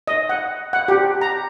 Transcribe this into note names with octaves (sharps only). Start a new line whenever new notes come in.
D#5
F#5
F#5
G4
A#5